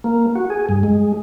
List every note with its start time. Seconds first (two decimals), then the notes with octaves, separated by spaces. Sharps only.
0.04 A#3
0.35 F#4
0.50 G#4
0.69 G2
0.83 G#3